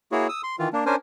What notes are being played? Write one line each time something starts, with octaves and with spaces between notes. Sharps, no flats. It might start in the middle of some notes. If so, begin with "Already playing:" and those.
A#3 E4 F#4 G#4 C#5
D#6 E6
C6
D#3 E3 F4
A#3 D4
C#4 D4 A#4 C5 G#5